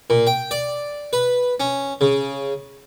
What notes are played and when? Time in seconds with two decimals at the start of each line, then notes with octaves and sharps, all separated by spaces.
0.10 A#2
0.27 G5
0.51 D5
1.13 B4
1.60 C#4
2.01 C#3